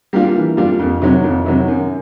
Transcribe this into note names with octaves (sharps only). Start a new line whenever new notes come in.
G3 A#3 D4 F4
E3
G3 A#3 D4 F4
F2
C3 D#3 F#3
F2
C3 D#3 F#3
F#2